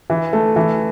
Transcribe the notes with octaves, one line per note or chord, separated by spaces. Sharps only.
E3
A3
E3